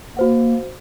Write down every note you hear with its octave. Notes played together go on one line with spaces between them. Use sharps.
A#3 F#4 C5 F#5